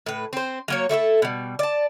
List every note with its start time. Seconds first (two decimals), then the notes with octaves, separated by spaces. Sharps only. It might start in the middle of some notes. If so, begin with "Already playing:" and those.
0.06 A2 B4
0.33 C4 C5
0.68 F#3 A#3 C#5
0.89 A3 E4 F#4 A4
1.22 B2 G3
1.59 D5 A5